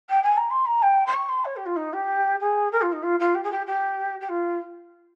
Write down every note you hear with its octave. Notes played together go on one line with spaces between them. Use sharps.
G5
G#5
A#5
C6
A#5
G5
C6
C#6
C6
C#5
G4
F4
D#4
G4
G#4
A#4
F4
D#4
F4
F4
G4
G#4
G4
G4
G4
F4